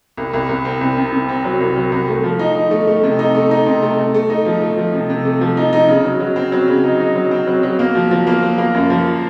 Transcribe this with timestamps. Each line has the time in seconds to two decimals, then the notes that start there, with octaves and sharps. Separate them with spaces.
0.17 C2
0.33 C2
0.49 C2
0.65 C4
0.81 C2
0.97 C3
1.13 C3
1.29 C4
1.44 F#3
1.60 C2
1.76 F#3
1.92 C2
2.08 A3
2.24 F3
2.39 D#4
2.55 D#4
2.71 A3
2.87 A3
3.03 C3
3.19 D#4
3.35 A3
3.51 D#4
3.66 C3
3.82 A3
3.98 A3
4.14 A3
4.30 D#4
4.46 F3
4.62 A3
4.77 F3
4.93 C3
5.10 C3
5.25 A3
5.41 F3
5.57 D#4
5.73 D#4
5.88 C#3
6.04 F#3
6.20 F#3
6.36 C4
6.52 F#3
6.68 C#3
6.84 D#4
7.00 D#4
7.16 F#3
7.31 C4
7.47 F#3
7.63 F#3
7.79 A#3
7.95 F3
8.11 F3
8.27 A#3
8.43 F3
8.58 A#3
8.74 F#2
8.90 F3